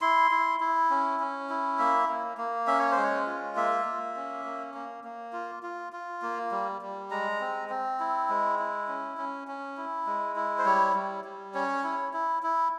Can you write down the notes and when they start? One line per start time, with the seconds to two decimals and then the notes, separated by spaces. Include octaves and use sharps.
0.01 E4 C6
0.31 E4
0.60 E4
0.90 C#4
1.20 C#4
1.50 E4
1.79 A#3 E5
2.08 A#3
2.37 A#3
2.67 C#4 E5
2.79 C#5
2.92 C5
2.97 G#3
3.03 C#5
3.26 F4
3.56 A#3 E5
3.85 A#3
4.16 C#4
4.45 A#3
4.74 A#3
5.04 A#3
5.33 F4
5.63 F4
5.93 F4
6.22 A#3
6.52 G3
6.82 G3
7.11 G#3 A#5
7.41 C4
7.70 C4
8.00 E4
8.29 G#3
8.59 E4
8.88 C#4
9.18 C#4
9.48 C#4
9.77 E4
10.06 G#3
10.36 E4
10.58 C5
10.66 G3 C#5
10.95 G3
11.24 G3
11.54 C#4 C#5
11.84 E4
12.13 E4
12.43 E4